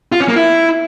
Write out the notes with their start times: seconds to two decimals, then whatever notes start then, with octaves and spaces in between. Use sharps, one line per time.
0.12 F4
0.20 C#4
0.28 A#3
0.36 E4